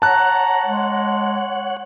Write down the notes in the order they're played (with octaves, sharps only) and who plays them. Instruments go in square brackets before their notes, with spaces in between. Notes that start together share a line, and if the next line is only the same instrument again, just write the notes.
[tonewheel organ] C#5 F#5 [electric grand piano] A5 F#6 [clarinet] A#5
[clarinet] G#3